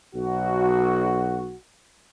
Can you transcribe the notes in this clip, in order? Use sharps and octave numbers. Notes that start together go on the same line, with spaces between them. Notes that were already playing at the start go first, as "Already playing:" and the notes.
B1 F#4